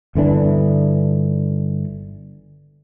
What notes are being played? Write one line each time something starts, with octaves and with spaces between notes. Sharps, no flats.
G1 D3 E3 D4